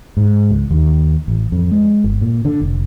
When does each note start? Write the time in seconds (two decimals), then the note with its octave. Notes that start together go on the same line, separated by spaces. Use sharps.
0.17 G#2
0.50 C#2
0.71 D#2
1.28 A1
1.52 F2
1.72 G#3
2.04 G1
2.21 A#2
2.45 D3
2.62 F1